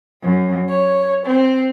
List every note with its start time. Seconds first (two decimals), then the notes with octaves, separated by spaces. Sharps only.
0.24 F#2
0.70 C#5
1.25 C4